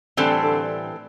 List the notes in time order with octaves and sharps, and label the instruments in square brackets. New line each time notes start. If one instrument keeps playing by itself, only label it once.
[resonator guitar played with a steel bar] A2 E3 G3 C4 A4 [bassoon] D3
[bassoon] D3